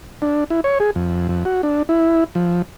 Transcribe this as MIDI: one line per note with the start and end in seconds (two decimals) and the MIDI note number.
0.22 0.44 62
0.50 0.61 64
0.64 0.78 73
0.80 0.91 68
0.95 1.28 41
1.29 1.44 41
1.45 1.62 66
1.63 1.83 62
1.89 2.24 64
2.35 2.62 53